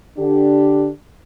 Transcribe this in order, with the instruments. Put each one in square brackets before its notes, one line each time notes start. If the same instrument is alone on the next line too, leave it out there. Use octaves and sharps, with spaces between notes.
[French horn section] D3 D4 G4